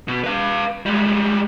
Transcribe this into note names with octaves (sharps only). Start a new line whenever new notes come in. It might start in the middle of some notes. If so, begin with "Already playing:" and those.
B2
B4 F5
G3 G#3